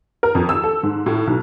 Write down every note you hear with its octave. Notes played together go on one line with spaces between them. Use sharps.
A#4
F2
E6
A4
G#2
A2
B1